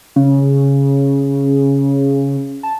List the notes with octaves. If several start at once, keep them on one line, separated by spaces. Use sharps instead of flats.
C#3
A5